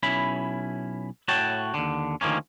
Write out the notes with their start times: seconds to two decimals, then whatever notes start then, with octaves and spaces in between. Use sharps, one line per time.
0.03 B1 C#4 E4 B5
1.28 A2 F#4 C#5 G5 A5
1.74 D#2 D3
2.21 D2 D#3 F3 A#3 C#4